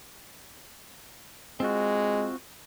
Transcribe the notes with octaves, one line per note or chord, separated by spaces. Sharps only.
G#3 C4 F4 F#4